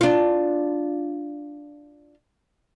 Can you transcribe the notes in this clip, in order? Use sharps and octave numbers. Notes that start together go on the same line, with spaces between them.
D4 F4